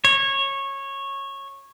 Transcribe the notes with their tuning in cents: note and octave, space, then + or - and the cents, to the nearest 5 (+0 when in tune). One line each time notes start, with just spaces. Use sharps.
C#5 -15